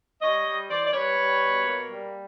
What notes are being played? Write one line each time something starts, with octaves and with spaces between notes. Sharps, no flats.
G3 C#5 D#5
G3
E3 C5 D5
D5
G3 B4 C#5
G3
B2
A#3
G3